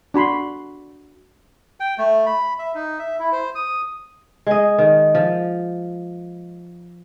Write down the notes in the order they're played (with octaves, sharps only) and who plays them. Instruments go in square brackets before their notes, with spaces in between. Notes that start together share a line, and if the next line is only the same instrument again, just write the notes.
[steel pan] D4 F#4 B5 C6
[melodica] G5
A3
B5
E5
D#4
E5
E4
C5
D#6
[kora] G#3 D#5
D#3
F3